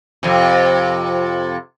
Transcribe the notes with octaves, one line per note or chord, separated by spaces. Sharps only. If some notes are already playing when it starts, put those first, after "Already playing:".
F2 C3